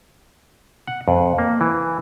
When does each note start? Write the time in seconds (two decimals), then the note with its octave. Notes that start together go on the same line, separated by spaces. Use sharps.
0.87 F#5
1.08 F2
1.38 A#3
1.61 E3